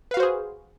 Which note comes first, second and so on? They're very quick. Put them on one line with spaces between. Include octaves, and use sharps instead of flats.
B4 F5 F#4 C5 G#4